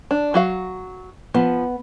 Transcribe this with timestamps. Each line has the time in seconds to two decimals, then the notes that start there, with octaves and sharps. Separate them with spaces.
0.11 D4
0.34 F#3 F#4 F5
1.34 F3 B3